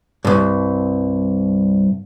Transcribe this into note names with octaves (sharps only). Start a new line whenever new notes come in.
C2 G2